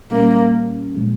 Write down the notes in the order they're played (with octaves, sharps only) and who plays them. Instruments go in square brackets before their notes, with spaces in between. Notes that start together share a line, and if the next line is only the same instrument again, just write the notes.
[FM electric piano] A#2 G3 C#4 [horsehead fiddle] A#3
[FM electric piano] A#2 F3 G#3